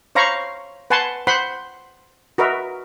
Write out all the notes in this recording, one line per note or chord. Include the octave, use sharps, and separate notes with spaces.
C5 C#5 F5 A#5 B5 C#6
B4 F#5 G#5 A5 C6
C5 F#5 B5 C6
F#4 A#4 B4 D#5 E5